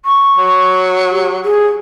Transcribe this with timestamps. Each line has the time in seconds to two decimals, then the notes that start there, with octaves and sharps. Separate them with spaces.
0.05 C#6
0.37 F#3
1.11 G4
1.44 G#4